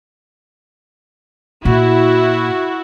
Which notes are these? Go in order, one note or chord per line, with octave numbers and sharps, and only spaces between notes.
A#2 E4 F#4